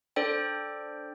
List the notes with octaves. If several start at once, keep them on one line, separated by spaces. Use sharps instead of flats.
D4 A4 C5 D5 G5